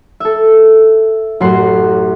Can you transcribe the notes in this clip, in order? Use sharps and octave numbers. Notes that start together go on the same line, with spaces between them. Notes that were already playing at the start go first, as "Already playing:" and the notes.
A4 E5
A1 F#2 F#4 F#5 C6 F#6